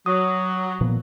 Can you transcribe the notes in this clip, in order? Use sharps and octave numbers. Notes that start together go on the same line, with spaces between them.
F#3 D#6
A#2 F3 B3